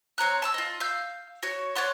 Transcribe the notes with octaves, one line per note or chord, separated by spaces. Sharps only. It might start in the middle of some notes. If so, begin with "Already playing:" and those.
C4 C#5 A#5 F#6
A5 C6 E6
F4 D#5
F5 E6 G6
F#4 C#5
C#5 D5 F#5 C6